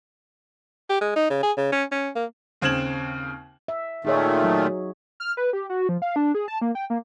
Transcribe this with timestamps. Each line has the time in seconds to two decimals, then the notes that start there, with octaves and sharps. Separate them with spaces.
0.90 G4
1.02 G#3
1.16 D#4
1.30 C#3
1.43 G#4
1.57 C#3
1.72 C#4
1.92 C#4
2.16 A#3
2.61 D#2 C#3 C4 G#6 E7 F#7
3.68 E5
4.05 A#2 D#3 A3 D#4 G#4 C#5
4.44 F#3
5.20 F6
5.37 B4
5.53 G4
5.70 F#4
5.89 F3
6.02 F5
6.16 D4
6.35 G#4
6.48 A5
6.62 A#3
6.75 G5
6.90 A#3